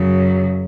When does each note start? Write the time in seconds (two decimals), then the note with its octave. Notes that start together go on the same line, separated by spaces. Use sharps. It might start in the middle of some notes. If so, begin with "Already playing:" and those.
Already playing: F#2 C#3 F#3